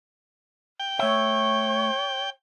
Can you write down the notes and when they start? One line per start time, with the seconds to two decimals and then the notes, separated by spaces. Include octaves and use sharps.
0.80 G5
0.99 A3 C#5 E5